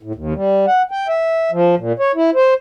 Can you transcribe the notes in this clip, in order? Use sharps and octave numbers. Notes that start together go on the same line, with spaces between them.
A2
D#2
G3
F#5
G5
E5
F3
A#2
C#5
E4
C5